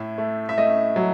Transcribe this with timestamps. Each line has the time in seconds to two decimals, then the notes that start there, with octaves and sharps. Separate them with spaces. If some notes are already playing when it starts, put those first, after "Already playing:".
Already playing: A2 E5
0.18 A3
0.49 E5
0.58 A3 D#5
0.96 F#3